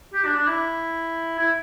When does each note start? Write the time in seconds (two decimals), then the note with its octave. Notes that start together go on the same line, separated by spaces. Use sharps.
0.14 G4
0.25 D4
0.37 D4
0.47 E4
1.39 E4